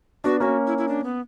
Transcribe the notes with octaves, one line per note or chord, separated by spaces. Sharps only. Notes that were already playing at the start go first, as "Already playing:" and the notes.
B3 D4 F#4
A#3 C#4 F#4
E4
E4
D4
B3